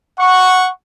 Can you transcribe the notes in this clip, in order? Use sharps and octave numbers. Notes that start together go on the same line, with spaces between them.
F#5 C#6